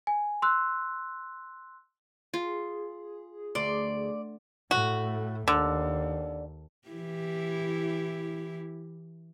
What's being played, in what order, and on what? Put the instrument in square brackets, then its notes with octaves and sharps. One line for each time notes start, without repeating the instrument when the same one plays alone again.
[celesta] G#5
C6 E6 F#6
[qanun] F4 [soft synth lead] G#4
[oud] D2 [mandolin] D5 [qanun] C6
[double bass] A2 A3 [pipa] F#4
[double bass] D#2 [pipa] D3
[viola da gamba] E3 E4 G4